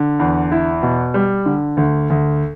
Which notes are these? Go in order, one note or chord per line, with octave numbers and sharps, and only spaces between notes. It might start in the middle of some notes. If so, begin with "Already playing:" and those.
Already playing: D3
E2
E4
B2
G3
D3
D2
D2